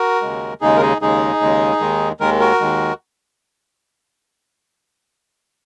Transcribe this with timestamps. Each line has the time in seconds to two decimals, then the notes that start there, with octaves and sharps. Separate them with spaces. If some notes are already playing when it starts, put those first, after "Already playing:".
Already playing: F#4 A#4
0.22 D#2 C#3 G#3
0.61 D#2 C#3 G#3 D#4 G#4
0.77 A#4
0.81 D#4 G#4
1.01 D#2 C#3 G#3 D#4 G#4
1.41 D#2 C#3 G#3
1.80 D#2 D#3 G#3
2.20 D#2 D#3 G#3 A#4
2.40 F#4 A#4
2.60 D#2 D#3 G#3